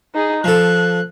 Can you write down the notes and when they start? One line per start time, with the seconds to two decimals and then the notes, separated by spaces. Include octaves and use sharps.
0.15 D#4 G#4
0.44 F3 A4 F#6